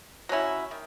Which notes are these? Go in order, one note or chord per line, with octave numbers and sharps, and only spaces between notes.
F#3 C#4 E4
D#3